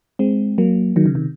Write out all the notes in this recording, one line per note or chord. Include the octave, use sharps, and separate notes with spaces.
G#3 C4
F#3 A#3
D#3 F#3
C#3
C3 D#3